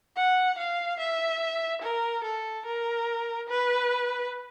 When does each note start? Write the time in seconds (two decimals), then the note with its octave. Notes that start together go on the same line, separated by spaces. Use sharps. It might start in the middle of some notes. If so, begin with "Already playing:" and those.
0.16 F#5
0.58 F5
0.99 E5
1.82 A#4
2.24 A4
2.66 A#4
3.49 B4